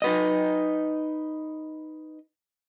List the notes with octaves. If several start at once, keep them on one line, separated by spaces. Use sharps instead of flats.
D#4 B4 D#5